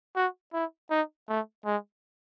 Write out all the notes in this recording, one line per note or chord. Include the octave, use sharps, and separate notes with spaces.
F#4
E4
D#4
A3
G#3